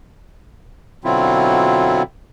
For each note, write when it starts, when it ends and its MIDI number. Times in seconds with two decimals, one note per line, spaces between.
1.04 2.03 47
1.04 2.03 50
1.04 2.03 54
1.04 2.03 60
1.04 2.03 64
1.04 2.03 65